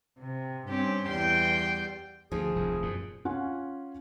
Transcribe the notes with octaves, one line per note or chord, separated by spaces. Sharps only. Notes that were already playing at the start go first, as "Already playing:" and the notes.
C3
G2 C4 C#4 G4
E2 G3 G5 C6
D2 F3 G#4
F1 D#2
F#2 A#2
C#4 F4 F#5 G#5